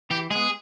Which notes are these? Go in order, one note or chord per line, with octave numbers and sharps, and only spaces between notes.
E3 G4
G#3 B3 G#4